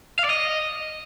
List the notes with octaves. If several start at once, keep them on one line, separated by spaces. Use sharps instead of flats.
F5
D5
D#5